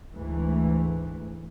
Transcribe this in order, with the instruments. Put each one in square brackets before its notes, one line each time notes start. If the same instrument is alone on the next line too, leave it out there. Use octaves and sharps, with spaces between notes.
[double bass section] D2 G#2 E3 A3